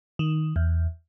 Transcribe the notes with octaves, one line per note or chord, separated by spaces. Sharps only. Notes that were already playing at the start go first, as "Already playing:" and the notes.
D#3
E2